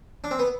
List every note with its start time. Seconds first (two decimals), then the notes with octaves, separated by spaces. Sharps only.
0.24 D4
0.31 C4
0.39 B3